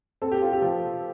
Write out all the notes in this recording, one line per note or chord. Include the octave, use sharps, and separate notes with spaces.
C4 A4
G4
F4
G4
F3